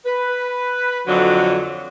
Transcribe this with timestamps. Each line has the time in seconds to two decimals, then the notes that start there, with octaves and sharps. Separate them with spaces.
0.06 B4
1.07 F2 D3 F#3